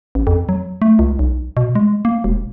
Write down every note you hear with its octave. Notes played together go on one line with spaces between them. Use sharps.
A1
F2
F#3
A3
C#2
B1
B2
G#3
A#3
E1